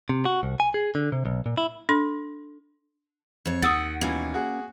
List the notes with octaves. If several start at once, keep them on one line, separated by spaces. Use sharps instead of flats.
C3
F#4
C2
G#5
G#4
D3
C3
B1
A#2
E4
D4 A4 C6
F2 C#5
D#2 F#5 D#6 E6 A6
B2 E3 A#3 C#4
F#4 G#4 F#5